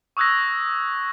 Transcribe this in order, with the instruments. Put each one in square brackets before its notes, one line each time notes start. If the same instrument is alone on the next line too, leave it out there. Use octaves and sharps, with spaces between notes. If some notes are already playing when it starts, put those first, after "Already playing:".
[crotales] C#6 D#6 E6 F#6 G#6 A#6